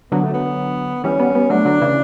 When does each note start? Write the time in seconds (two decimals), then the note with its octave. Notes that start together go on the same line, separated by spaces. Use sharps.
0.12 D3 F#3 B3
0.24 A3
0.34 B3
1.04 E3 G3 C#4
1.19 G3 B3
1.35 G3 B3
1.50 F#3 A3 D4
1.65 D3 F#3
1.81 C#3 E3